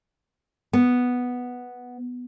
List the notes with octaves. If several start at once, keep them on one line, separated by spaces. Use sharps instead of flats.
B3